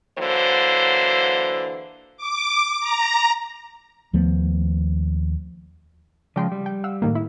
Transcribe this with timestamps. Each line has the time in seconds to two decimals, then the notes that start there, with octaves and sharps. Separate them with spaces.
0.18 D3 E3 F#3 A#3 C5
2.17 D6
2.80 A#5
4.13 D#2 F3 A3 B3
6.36 C#3 F3 G#3 D5 G5 C6
6.52 G3
6.66 G5
6.84 F5 F#5 E6
7.02 A2 D#3 A#3
7.15 E4